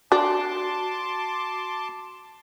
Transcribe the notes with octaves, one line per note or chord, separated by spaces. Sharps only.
D4 F#4 A5 C6 D6